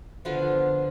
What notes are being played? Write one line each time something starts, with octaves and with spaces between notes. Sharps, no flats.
D3 F3 B3 F4